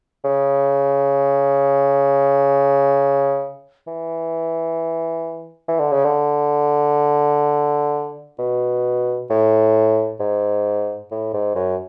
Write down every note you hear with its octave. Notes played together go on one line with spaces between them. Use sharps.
C#3
E3
E3
D3
C#3
D3
B2
A2
G#2
A2
G#2
F#2